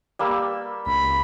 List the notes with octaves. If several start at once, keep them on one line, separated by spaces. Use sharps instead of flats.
G3 A#3 E6
C#2 B5